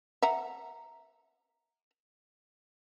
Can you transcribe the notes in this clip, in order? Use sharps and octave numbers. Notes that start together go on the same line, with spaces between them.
E5 F#5 A#5